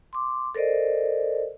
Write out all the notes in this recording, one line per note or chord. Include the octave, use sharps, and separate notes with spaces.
C6 D6
A4 A#4 C5 D5 D#5